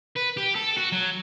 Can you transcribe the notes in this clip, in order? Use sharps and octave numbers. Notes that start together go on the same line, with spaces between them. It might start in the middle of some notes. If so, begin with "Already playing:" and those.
B4
G4
A4
F#4
F#3